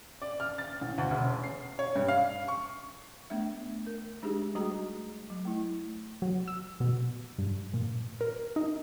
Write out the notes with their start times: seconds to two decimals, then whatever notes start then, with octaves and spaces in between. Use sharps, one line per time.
0.22 D5
0.40 F6
0.58 A6
0.81 A1
0.98 D2
1.11 E1
1.29 C#4
1.44 C7
1.79 C#5
1.96 G2
2.08 F5
2.48 C#6
3.30 A3 B3 D4 E5
3.87 A#4
4.22 G#3 D4 D#4 G4 G#4
4.55 G3 A3 F#4 G#4 A#5
5.30 F#3
5.45 A3 E4
6.22 F#3
6.48 E6
6.80 B2
7.38 G2
7.74 A#2
8.21 A#4
8.56 D#4